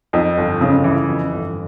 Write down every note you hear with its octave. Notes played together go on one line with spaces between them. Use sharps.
F2 D#4
G1
C#3
E3
F2
G1